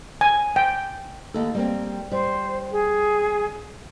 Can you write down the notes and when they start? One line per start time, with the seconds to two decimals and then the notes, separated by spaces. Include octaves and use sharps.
0.21 G#5
0.56 G5
1.34 D#2 A4
1.55 G3 A#3 C4
2.11 G3 C5
2.72 G#4